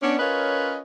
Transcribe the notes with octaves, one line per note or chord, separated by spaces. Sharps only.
B3 C#4 D4
C#4 F4 A#4 B4 C#5 D#5